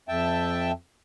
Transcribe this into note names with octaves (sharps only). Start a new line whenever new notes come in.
F2 E5 G5 A5